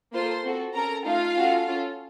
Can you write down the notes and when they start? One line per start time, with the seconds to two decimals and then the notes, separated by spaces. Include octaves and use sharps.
0.13 A#3 F4 A4 C5 C6
0.44 C4 F#4 A4
0.75 C#4 A4 A#4 A#5
1.05 A3 D#4 F4 A4 F5
1.36 C#4 F#4 A4
1.67 C#4 F4 A4